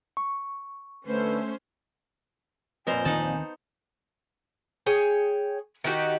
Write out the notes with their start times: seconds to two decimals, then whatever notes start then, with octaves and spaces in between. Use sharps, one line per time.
0.17 C#6
1.06 D3 A3 C#4 B4 C5
2.87 F2 A#2 B3 A#4 C5 G#5
3.05 D2 D#3 C4 D#4 F#5 A5
4.86 G#4 C#5 G5
5.84 D#3 D#4 F#4 G4